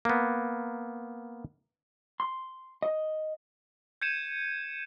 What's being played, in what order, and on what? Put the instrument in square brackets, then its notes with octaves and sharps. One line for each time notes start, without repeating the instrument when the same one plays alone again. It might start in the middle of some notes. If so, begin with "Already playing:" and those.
[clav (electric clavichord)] A#3 B3
[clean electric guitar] C6
D#5
[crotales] G6 G#6 C#7 D#7 E7